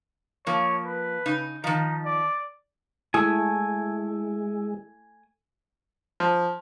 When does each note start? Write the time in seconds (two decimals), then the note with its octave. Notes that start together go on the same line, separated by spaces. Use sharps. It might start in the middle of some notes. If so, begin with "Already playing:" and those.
0.47 F3 A#3 C#5
0.85 B4
1.26 C#3 D#4
1.64 D#3 F3 D#4
2.05 D5
3.14 G#3 A3 E4 G#5 D#6
6.20 F3